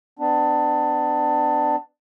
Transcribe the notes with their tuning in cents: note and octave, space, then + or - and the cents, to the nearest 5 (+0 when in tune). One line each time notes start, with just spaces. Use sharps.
B3 +35 D4 +15